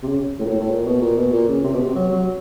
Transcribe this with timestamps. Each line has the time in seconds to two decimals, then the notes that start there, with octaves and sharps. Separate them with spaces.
0.03 C3
0.08 C#3
0.39 A2
0.45 A#2
0.50 A2
0.60 A2
0.70 A#2
0.86 B2
1.02 A#2
1.17 B2
1.33 A#2
1.48 C#3
1.64 C3
1.74 B2
1.80 C3
1.95 F#3
2.11 F#3